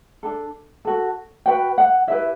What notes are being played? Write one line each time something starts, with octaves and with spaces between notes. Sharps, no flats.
D4 A4
F#4 A4
F#4 B4 G5
F#5
E4 G4 B4 E5